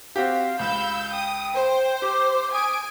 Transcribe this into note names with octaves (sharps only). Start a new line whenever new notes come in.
C4 F#4 G4 F5
C#2 F5 B5 E6 G6
G5 D#6
C5
G4 D6
G#5 D#6 D7